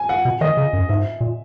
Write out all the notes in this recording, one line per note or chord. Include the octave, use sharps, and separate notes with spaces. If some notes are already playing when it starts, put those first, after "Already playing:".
Already playing: G#5
F#5
B2
D#3 D#5
C#3
F#2
G#2 E5
A#2